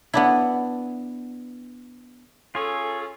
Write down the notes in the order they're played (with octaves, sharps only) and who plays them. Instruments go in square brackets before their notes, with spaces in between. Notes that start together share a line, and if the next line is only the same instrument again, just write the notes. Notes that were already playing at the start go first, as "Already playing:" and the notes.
[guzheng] B3 D4 E4
[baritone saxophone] C#4 [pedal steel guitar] F4 G#4 [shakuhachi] A4